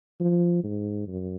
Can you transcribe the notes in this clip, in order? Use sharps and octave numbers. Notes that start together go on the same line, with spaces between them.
F3
G#2
F#2